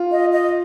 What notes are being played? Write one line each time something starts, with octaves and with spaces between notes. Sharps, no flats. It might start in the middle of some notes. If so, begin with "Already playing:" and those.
Already playing: F4
D#5
D#5